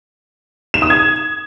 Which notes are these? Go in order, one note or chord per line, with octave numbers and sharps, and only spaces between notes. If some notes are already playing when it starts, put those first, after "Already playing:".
E7
D#6
G#6